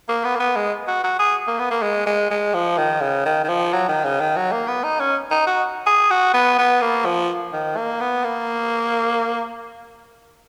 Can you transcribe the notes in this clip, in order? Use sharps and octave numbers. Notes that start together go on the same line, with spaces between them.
A#3
B3
A#3
B3
G#3
F#4
F#4
G#4
A#3
B3
A#3
G#3
G#3
G#3
F3
D#3
C#3
D#3
D#3
F3
F#3
D#3
C#3
D#3
F#3
A#3
B3
D#4
C#4
D#4
F#4
G#4
F#4
B3
B3
A#3
F3
D#3
A#3
B3
A#3